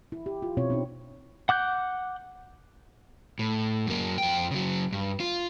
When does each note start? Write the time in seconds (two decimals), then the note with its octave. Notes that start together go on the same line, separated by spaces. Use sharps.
0.12 E4
0.26 G4
0.42 F4
0.57 B2 C4 E4 C#5
0.70 C4 D4 D#4
1.49 F#5 D6 F#6 G6
3.39 A2
3.87 F#2 A#3
4.18 F2 G5
4.51 C#3 F#3
4.92 G2
5.20 F4